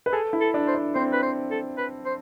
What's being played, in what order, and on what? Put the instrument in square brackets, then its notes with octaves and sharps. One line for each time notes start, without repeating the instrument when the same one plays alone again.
[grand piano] B4
[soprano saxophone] G#4 [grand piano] A4
[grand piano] E4
[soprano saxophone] A4
[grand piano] D4
[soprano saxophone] C5
[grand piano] D4
[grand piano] C4 [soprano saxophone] C5
[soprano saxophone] B4
C5
A4
B4
C5